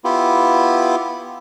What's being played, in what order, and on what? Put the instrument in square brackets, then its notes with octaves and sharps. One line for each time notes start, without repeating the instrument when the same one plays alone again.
[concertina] B3 E4 F4 G4